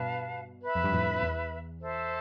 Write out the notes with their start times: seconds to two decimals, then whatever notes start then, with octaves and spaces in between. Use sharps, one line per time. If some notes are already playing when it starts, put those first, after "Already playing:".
Already playing: G2 B2 B4 F5 A5
0.64 B4 E5 B5
0.75 F2
0.84 G2
0.92 F2 A2
1.23 E2
1.80 A4 C5 E5